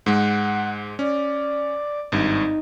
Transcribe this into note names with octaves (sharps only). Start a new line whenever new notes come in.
G#2 G#3 F#5
C#4 D5
G#1 G2 D#4